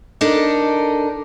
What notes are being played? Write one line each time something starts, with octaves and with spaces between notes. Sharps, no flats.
D4 D#4 A4 A#4